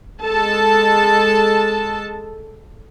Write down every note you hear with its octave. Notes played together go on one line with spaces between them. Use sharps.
G#3 A4 A5